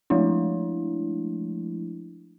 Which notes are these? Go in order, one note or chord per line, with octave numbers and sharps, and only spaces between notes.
F3 G#3 A3 D4 E4